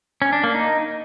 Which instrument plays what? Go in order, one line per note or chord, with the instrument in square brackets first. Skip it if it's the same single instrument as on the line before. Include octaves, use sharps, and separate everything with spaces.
[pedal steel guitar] C#4
D4
A#3
D#4